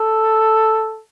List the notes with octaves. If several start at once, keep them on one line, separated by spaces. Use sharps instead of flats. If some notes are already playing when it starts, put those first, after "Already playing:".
Already playing: A4